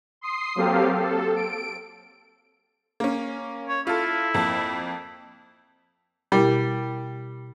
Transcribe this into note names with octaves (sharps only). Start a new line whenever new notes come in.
C6 D#6 C7
F#3 A#3 C4 G4 A4 F5
A4
D7
A#3 C#4
C#5
E4 F4 A4
F2 A#3 A5
B2 G3 E4 A#4